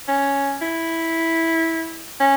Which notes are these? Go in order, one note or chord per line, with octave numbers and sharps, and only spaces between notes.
C#4
E4
C#4